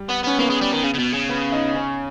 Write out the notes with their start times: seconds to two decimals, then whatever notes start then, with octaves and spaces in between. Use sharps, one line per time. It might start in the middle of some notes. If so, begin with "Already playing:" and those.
Already playing: G3
0.09 B3
0.23 B3 C#4
0.39 A#3 B3
0.50 G#3
0.61 G3
0.72 D#3
0.84 C#3
0.94 C#3
0.99 B2
1.14 C#3
1.29 B3
1.52 D#4
1.75 C#4